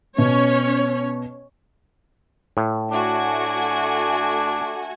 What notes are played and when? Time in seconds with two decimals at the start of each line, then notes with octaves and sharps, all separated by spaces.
0.18 B2 C#4 C#5
2.57 A2
2.92 A3 D4 F#4 G#5